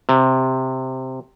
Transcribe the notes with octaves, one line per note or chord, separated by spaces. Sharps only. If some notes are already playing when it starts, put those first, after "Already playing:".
C3